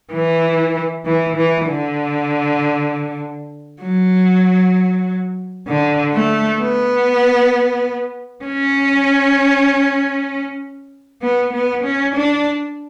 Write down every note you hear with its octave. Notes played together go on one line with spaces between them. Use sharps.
E3
E3
E3
D3
F#3
D3
A3
B3
C#4
B3
B3
C#4
D4